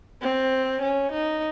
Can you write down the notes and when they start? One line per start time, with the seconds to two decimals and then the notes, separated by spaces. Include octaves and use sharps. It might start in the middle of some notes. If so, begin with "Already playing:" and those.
0.22 C4
0.83 C#4
1.12 D#4